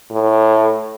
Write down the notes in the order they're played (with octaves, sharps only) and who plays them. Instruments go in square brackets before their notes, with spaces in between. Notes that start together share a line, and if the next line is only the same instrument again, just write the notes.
[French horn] A2